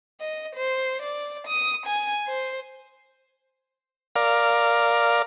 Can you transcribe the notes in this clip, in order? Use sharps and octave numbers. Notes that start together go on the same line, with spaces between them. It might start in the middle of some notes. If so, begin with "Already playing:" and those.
D#5
C5
D5
D#6
G#5
C5
A#4 D5 F5